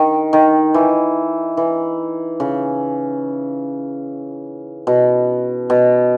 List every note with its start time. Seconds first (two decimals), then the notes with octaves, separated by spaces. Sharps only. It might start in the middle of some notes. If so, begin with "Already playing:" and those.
Already playing: D#3
0.33 D#3
0.74 E3
1.57 E3
2.40 C#3
4.87 B2
5.70 B2